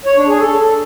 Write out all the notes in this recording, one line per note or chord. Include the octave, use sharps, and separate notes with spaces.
C#5
D4
G#4
A4